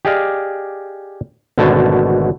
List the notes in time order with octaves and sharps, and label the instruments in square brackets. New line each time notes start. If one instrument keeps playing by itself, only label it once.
[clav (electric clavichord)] G4 G#4 D5 D#5 F5
G#1 B2 D3 A3 C#5 A5